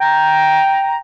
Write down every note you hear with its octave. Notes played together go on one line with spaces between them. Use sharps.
G5 A#5